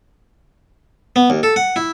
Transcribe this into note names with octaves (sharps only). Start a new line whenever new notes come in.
B3
D#2
A4
F#5
E4